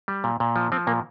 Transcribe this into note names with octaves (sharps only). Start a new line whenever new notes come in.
G3
A#2
A#2
F3
F3 C4
A#2 A#3